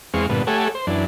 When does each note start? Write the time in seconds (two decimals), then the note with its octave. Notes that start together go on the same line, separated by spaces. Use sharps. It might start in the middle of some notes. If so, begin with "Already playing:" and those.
0.14 E2 G#3 C4 F5 C#6
0.30 G2 A#2 D3 B3
0.47 A3 G4 A4 C#5 F#5 G#5
0.75 C5
0.87 F#2 E3 D4